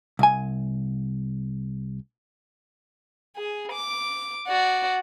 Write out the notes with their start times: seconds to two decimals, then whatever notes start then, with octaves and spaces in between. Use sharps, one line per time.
0.19 C2 G#5
3.36 G#4
3.72 D6
4.47 F#4 D5